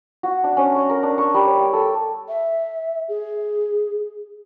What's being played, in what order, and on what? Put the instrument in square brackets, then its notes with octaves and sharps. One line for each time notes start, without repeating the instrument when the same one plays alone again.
[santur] F#4
D4
C#4
C#6
A#4
D4
C#6
G3
C#5
G5
A4
[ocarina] E5
G#4